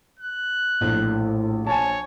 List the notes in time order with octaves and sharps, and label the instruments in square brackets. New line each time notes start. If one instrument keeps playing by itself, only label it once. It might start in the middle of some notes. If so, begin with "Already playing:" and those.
[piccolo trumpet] F#6
[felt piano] A#1 [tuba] A2
[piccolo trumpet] C#5 [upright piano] G#5 A5